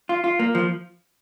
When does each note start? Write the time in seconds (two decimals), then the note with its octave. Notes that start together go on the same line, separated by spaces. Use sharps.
0.09 F4
0.24 F4
0.39 A#3
0.55 F3